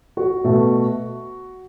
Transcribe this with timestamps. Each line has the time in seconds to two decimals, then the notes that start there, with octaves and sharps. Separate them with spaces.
0.17 F#4
0.44 B2 A3